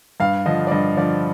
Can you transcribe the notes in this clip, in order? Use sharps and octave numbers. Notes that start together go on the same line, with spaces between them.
G2 F5
D3 F3 D#5
D5
G2 D#5
D3 F3 D5